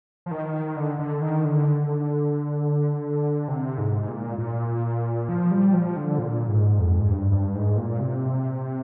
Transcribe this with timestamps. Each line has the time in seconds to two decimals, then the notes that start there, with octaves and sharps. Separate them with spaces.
0.26 F3
0.31 D#3
0.76 D3
0.99 D3
1.21 D#3
1.45 D3
3.48 C3
3.78 G#2
4.08 A#2
4.38 A#2
5.29 F3
5.51 G3
5.74 F3
5.96 D3
6.19 A#2
6.49 G#2
6.79 F2
7.00 G#2
7.10 G2
7.32 G2
7.55 G#2
7.77 A#2
8.00 C3